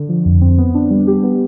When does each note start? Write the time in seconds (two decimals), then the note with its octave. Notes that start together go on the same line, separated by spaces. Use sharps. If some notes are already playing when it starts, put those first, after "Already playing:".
Already playing: D3
0.09 F3
0.25 F2
0.41 C4
0.58 B3
0.74 D4
0.90 G3
1.07 G4
1.23 B3